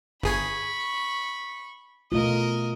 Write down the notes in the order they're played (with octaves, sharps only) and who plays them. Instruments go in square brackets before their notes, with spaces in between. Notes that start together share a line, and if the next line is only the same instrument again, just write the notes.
[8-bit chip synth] G1 G#4 G#5 [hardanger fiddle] B5 C#6
[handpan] B2 A3 F4 [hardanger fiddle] A#4 D#5